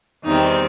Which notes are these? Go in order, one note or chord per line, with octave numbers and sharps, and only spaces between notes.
E2 D#3 G3 C4 D#4